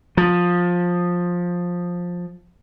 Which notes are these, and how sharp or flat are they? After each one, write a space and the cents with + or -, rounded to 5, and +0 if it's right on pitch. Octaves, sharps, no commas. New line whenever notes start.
F3 +15